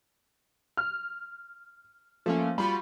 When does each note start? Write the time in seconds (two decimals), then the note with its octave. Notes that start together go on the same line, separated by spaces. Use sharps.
0.77 F6
2.26 F3 A3 A#3 C#4
2.58 G3 F4 F#4 B5